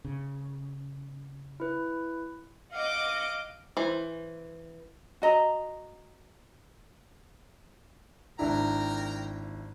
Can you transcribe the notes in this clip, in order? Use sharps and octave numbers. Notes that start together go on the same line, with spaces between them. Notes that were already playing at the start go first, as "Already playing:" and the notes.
C#3
E4 B4
D#5 F5 F#5 D6
E3 C5
F#4 D#5 A#5
G#1 D4 E4 A#4 G5 A#5